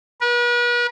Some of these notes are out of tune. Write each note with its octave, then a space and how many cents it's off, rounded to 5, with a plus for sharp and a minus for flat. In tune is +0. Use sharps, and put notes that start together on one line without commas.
B4 -40